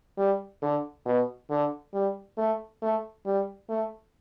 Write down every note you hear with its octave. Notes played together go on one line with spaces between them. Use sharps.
G3
D3
B2
D3
G3
A3
A3
G3
A3